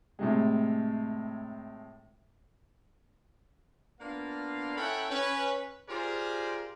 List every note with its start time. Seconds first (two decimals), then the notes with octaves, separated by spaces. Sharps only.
0.19 A2 C3 G#3
3.99 A#3 B3 D4 F4 F5
4.76 C#4 E4 A4 F#5 G5 B5
5.10 C#4 B4
5.88 F4 G4 G#4 A#4 C5 D5